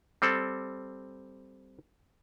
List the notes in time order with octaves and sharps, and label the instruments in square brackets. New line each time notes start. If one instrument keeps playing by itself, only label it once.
[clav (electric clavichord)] G3 C4 A4